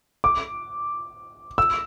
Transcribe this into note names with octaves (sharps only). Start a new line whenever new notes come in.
D6
E6